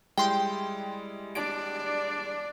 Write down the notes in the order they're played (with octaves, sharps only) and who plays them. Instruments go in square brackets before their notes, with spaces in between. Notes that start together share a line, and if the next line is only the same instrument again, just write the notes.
[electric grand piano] G3 G#3 E4 [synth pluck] G5 C6
[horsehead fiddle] D4 D5 [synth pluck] D7